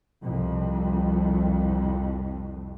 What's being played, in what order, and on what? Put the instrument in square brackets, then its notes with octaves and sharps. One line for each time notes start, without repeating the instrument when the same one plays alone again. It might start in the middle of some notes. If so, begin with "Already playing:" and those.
[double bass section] C2 F2